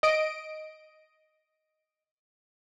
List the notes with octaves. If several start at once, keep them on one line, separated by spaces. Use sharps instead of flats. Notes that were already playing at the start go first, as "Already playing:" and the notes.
D#5 D7